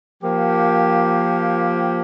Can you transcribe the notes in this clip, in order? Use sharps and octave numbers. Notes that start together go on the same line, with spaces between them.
F3 A#3 G4